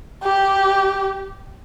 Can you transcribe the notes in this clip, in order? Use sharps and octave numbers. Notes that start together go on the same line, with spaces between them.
G4